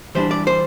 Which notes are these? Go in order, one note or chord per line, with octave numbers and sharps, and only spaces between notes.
E3 G3 D4 C5
D5
C5